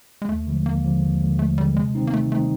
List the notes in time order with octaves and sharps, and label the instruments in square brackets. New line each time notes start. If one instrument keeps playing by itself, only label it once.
[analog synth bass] G#3
[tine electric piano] D#2 [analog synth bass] A3
[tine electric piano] D3 F3 G#3
[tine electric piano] D#2 [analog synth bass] A#3
[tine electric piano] D3 F3 G#3
D#2
D3 F3 G#3
[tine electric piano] D#2 [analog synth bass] A3
[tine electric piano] D3 F3 G#3 [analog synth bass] G3
[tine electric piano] C3 [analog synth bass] G#3
[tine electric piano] D#3 G3 C4 D#4
[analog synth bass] A#3
[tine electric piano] C3 [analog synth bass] A3
[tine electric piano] D#3 G3 C4 D#4 [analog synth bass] A3